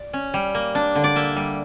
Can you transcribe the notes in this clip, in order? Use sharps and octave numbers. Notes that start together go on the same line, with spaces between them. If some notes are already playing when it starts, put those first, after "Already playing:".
Already playing: D5
C#4
G3
A#3
D4
D3
D5
A#3 E5
G3